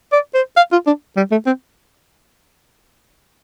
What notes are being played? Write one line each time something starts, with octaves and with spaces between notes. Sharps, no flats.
D5
C5
F5
F4
D4
G3
A3
C4